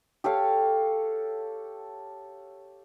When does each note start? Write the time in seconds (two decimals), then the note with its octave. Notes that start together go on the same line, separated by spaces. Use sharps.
0.24 G4 A4 C#5 F5